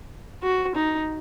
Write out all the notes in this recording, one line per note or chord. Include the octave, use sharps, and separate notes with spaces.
F#4
D#4